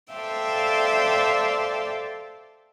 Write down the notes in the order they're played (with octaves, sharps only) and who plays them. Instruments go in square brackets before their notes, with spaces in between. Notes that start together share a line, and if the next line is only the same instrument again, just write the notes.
[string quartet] A4 C5 D5 E5 F5 G5